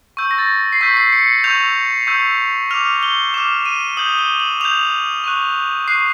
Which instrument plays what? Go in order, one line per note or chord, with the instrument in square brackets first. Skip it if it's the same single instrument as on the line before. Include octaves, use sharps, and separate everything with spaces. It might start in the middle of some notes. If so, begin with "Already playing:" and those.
[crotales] C#6 E6 G6
A#6
A6
C7
C#6 E6 G6 B6
C7
C#7
C#6 E6 G6 F7
C#6 E6 G6
D6 F6 F7
G7
D6 F6 E7
D#7
D#6 G6 F#7
G7
F#7
D#6 G6 F7
C#6 F#6
C#6 F#6 C7